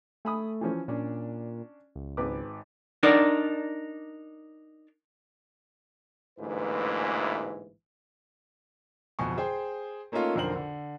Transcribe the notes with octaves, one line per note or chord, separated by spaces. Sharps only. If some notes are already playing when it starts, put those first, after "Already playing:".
A3 G#5 B5 D#6
E3 F3 C#4
A#2 C#4 D4
C#2
G#1 B4 D6
D4 D#4 A#4 D5
A1 D2 G#2 E3 A#3 B4
D1 F2 B2 G#5 C#6
G#4 C5 G5
A3 A#3 C#4 D#4 F4 A4
B1 F2 D3 A#4 C5 F#7
D3